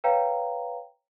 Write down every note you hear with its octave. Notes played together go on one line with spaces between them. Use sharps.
B4 C#5 F5 G5 A#5